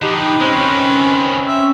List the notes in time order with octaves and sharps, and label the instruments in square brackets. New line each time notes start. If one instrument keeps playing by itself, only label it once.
[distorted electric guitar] D3 F3 [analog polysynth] D#4 G4 [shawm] B4
[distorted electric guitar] G#3 [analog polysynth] C4 C#4
[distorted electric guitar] C#2 D#3
[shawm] E5